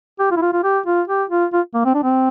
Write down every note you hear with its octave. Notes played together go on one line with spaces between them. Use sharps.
G4
F4
E4
F4
F4
G4
F4
G4
F4
F4
A#3
C4
D4
C4